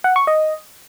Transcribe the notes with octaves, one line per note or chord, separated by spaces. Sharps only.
F#5
C#6
D#5